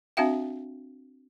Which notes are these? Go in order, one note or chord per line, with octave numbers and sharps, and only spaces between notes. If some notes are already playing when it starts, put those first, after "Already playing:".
C4 D4 F#4 E5 F5 G5